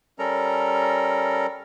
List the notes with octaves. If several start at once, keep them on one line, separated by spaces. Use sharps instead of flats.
G3 C#4 A4 A#4 A#5